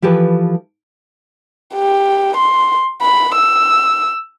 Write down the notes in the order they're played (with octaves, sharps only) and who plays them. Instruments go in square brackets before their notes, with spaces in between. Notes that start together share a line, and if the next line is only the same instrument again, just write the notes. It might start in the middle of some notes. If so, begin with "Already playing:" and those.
[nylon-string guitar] E3 F3 G4 A4 B4
[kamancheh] G4
C6
B5
E6